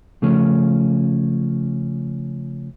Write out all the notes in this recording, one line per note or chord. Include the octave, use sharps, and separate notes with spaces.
C#3 F3 A3 C#4